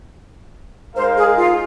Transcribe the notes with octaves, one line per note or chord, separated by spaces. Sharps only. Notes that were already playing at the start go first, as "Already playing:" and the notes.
G#3 D#4 A#4 C5 F5
G#4
F4